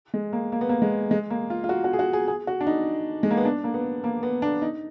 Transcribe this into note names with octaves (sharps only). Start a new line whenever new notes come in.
G#3
A#3
A#3
B3
A#3
G#3
G#3
A#3
F4
F4
F#4
F#4
G#4
F#4
G#4
G#4
F#4
D4
D#4
G#3
A#3
B3
D4
A#3
B3
A#3
B3
D4
D#4